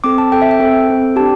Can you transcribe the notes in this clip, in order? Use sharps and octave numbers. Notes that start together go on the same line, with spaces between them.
C4 A4 D6
A5
C4 A4 G5
E5
G5
C4 A4
C4 A4
D4 G4 A5